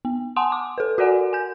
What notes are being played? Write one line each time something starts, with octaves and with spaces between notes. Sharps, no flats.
B3
F#5 G#5 A5 C6 D#6
D6
A4 B4
F#4 A#4 D5 F#5 G#5
G#5 G6